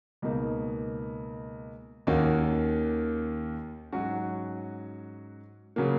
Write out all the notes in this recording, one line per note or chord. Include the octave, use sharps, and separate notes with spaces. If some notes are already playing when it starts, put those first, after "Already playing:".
C#2 B2 A#3 D#4
D#2 D#3 A#3 C#4 F#4
G#2 F#3 C#4 F#4
C#3 F#3 A#3